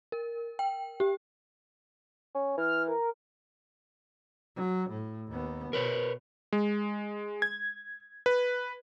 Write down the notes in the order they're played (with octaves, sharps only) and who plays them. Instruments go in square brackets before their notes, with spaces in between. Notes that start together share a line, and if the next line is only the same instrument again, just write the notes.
[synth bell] A#4
G5
G4
[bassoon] C#4
[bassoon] E3 [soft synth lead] F6
[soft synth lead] A#4
[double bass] F#3
A2
D#2 B3
[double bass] B2 [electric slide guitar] A#4 B4 C#5
[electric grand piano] G#3
G#6
B4